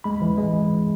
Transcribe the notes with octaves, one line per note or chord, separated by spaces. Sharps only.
G#3 B5
E3
G#3